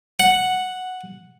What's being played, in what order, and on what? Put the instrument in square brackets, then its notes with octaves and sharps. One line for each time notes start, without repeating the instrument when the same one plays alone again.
[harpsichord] F#5